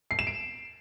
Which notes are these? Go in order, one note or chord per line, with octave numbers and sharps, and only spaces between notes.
C7
E7
D7